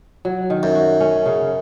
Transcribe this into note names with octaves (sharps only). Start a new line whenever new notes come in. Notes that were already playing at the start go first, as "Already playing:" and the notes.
F#3
D#3
F#2
F#4
C#4
C#3